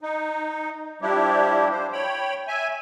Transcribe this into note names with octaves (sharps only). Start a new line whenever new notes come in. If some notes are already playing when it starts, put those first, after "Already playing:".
D#4
F3 G3 D4 E4 G4
C5
C#5 G5 B5
E5 G#5